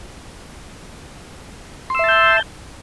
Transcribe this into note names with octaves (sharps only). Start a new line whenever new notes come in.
E5 A5 C6 E6 G6